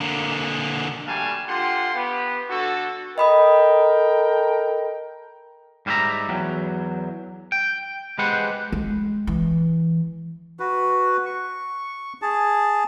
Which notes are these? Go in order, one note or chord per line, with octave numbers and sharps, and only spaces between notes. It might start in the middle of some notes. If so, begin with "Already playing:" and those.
D3 A#3
F#2 G3 A3 F5 G#5 A5
D3 F4 G4 F#5 C6
B3 G4
D3 F#4 A4
A4 A#4 D#5 G5 B5 D#6
G#2 G3 F4 C5 E5 A#5
E2 F#3
G5
G#3 G4 B4 C5 F#5
G#3
E3
F#4 B4
C#6
G#4 A5